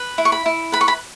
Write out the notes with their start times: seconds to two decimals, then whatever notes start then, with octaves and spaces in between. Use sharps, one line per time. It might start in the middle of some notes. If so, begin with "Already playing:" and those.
Already playing: B4
0.18 E4
0.25 C#6
0.32 B5
0.46 E4
0.72 B4 B5
0.81 C#6
0.88 B5